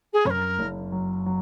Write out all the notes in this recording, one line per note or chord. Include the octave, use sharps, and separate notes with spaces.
G#4
F#2 A#4 C#5
F#1
F#3
F#3